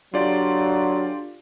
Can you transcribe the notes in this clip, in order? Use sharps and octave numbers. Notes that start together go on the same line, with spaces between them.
D3 F#3 F4 G4 D5